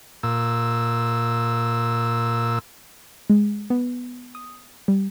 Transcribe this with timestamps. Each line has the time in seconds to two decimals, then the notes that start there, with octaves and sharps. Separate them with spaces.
0.23 A#2 E6
3.30 G#3
3.70 B3
4.35 D#6
4.88 G3